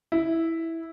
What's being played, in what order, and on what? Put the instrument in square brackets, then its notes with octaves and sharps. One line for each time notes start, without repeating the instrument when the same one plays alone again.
[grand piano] E4